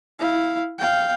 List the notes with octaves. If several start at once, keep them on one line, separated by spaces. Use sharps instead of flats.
E4 F5
F5 G5